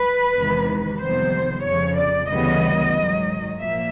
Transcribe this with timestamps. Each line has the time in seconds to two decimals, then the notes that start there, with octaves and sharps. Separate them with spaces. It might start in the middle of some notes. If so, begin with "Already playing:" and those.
Already playing: B4
0.36 E2 C3 D#3 G#3
1.02 F2 C3 D#3 G3 B3 C5
1.65 F2 C#3 F3 C#5
1.98 D5
2.30 D2 C#3 E3 G3 B3 D#5
2.95 G#2 D#3 F#3
3.59 A#2 F3 A#3 E5